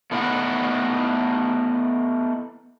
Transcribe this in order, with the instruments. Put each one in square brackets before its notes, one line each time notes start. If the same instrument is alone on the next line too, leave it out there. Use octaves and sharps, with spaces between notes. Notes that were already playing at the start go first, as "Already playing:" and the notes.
[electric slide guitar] A3 B3 D#4 E4 F5 F#5